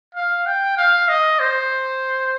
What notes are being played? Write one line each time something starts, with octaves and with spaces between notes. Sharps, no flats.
F5
G5
F5
D#5
C5